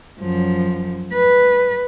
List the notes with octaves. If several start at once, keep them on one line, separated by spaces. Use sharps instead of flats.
F#2 F3
B4